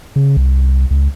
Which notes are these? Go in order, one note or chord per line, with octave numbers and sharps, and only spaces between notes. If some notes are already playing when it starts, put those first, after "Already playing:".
C#3
C2
C#2